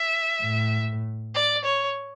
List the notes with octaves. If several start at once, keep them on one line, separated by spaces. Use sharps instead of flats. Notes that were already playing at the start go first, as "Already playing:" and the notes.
Already playing: E5
A2
D5
C#5